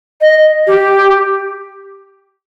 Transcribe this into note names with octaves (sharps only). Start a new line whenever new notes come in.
D#5
G4